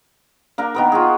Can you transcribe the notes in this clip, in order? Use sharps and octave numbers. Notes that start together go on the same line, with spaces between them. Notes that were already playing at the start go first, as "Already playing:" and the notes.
A#3 D4 A#4
D#3 B3 A#4
F4 F#4 G#4